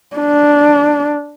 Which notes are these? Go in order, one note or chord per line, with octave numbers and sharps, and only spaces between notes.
D4